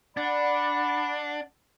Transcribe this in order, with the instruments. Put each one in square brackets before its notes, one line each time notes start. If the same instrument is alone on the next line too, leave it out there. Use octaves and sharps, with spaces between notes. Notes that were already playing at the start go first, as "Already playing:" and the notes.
[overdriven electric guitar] D4 [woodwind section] D5 F#5 [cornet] B5